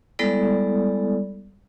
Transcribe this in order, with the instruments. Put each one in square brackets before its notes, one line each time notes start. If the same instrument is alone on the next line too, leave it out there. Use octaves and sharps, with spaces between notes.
[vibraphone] G3 G#3 B3 E4 A4 D5